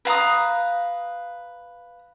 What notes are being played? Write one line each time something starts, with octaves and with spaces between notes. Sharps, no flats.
B4 F5 A#5 D#6